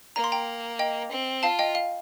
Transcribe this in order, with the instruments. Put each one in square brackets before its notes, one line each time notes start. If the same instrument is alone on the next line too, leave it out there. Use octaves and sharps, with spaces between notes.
[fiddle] A#3 [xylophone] A#5
[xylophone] C6
G5 A#5
D#5 G5
[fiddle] C4
[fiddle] F4 [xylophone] F5 A5
[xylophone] D#5 G5
F5